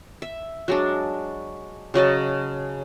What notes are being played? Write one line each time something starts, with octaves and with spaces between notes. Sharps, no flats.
E5
F#3 G#3 D4
C#3 F#3 D#5 A5